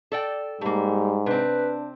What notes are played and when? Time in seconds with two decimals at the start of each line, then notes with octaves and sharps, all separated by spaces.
0.12 A4 D5 G5
0.61 G#2 G3 A3 A#3
1.26 C3 C4 D4 B4